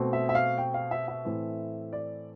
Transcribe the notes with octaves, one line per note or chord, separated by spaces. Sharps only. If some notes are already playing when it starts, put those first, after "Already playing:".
Already playing: B2 A3 C4
E5
E5
F5
G5
F5
E5
E5
A2 E3 A3 C4
D5